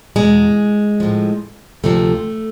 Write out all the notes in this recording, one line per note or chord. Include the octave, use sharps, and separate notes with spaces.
E2 B2 G#3
A2 F3
D2 C3 F3 A3